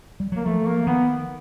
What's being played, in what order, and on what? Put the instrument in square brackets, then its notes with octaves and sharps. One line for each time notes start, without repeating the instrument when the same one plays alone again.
[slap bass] G3
[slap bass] F#3 [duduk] A#3
[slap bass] F3 [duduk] A3
[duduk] A#3
[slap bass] D#3 [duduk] B3